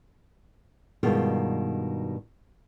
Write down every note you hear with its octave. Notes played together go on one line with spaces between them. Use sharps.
G2 B2 D#3 G#3 F4